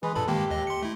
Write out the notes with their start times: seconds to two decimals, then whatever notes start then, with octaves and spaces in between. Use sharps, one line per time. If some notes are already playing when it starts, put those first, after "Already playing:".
0.03 E3 G#3 G#4 B4
0.15 G2 A#2 A4 B5
0.28 D#3 G#3 A#3 G4
0.50 D#2 D#5
0.67 C6 C#7
0.82 A3 E4